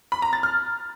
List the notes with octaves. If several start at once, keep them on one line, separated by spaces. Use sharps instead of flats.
B5
A#5
A6
F6